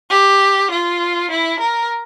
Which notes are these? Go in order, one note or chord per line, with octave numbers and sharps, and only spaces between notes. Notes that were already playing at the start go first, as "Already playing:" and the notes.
G4
F4
E4
A#4